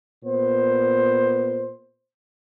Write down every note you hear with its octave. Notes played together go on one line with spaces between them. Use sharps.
A#2 B3 C5